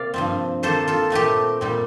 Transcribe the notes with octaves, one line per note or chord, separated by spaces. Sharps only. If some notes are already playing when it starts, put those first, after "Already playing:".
Already playing: C3 A#3 D5 F5
G2 F3 C4
D#3 A#3 D#4 A4 C5
F4 A4
A#2 A3 C4 D#4 G4
A#2 G3 C4 D#4